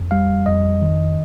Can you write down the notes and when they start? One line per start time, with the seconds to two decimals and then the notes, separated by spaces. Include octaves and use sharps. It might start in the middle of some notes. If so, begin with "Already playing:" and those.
Already playing: F2
0.11 G3 F5
0.46 F2 D#5
0.82 D#3